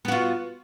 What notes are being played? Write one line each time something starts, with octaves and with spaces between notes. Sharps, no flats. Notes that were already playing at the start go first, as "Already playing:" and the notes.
B3 F4 F#4